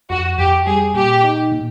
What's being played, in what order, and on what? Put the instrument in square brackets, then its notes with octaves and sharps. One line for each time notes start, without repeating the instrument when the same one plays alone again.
[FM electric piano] F2 [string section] F#4
[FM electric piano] F2 [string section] G4
[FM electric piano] G3 [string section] G#4
[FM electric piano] A#2 [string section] G4
[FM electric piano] D#4
A#2